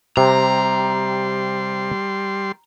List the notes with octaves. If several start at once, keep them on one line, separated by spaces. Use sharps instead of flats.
C3 G3 A#5 C6